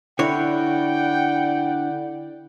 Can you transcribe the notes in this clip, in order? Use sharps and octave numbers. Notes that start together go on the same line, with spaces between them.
D3 E4 C#5 D5 F#5 G5